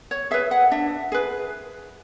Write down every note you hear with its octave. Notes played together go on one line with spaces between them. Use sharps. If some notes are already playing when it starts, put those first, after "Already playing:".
C#5
G#4 B4 E5
F#5
D4 E5
G#4 B4